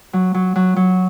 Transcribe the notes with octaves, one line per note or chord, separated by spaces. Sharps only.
F#3
F#3
F#3
F#3